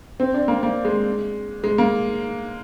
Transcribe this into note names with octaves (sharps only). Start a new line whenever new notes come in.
C4
D4
A#3
A#3
G#3
G#3
A#3